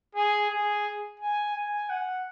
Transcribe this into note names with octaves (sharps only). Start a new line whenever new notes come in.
G#4
G#4
G#5
G#5
F#5